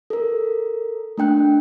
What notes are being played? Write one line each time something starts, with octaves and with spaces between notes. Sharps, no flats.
A4 A#4
A3 D4 G5 F#6